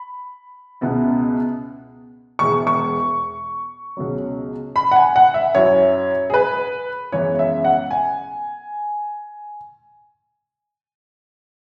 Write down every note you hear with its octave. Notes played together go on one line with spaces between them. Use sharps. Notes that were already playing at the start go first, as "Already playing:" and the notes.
Already playing: B5
C#2 B2 B3 E4
E1 E2 B2 G#3 E4 C#6
C#6
C#2 B2 F#3
B5
F#5
G#5
F#5
E5
F#2 F#3 C#4 E4 C#5
G#4
B4
F#2 C#3 E3 G#3 B3 C#5
E5
F#5
G#5